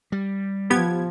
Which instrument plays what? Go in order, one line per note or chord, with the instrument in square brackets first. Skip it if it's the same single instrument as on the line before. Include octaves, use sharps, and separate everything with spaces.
[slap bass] G3
[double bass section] F3 [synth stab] B3 G4 G#6